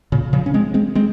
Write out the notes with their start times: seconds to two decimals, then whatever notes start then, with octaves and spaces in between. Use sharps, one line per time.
0.12 A#2 C#3
0.33 C#3 F3
0.46 C#4
0.54 G#3 C4
0.74 G#3 C4
0.95 G#3 C4